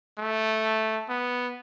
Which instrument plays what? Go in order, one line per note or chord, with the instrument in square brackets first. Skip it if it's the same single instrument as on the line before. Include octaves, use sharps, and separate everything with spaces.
[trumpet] A3
B3